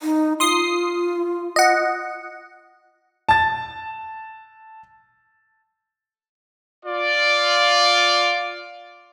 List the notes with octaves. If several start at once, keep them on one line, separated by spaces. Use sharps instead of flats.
D#4
F4 C6 D#6 C7
D#5 F#5
A5 A6
F4 D5